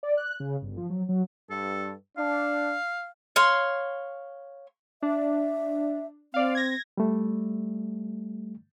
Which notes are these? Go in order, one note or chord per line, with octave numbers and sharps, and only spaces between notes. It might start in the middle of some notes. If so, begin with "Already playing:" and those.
D5
F#6
C#3
G1
F3
F#3
F#3
G2 A4
D4 F5
C#5 F5 C6
D4 E5
C4 D5 F5
G#6 A#6
G3 A3